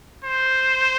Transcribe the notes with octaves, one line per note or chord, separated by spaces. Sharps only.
C5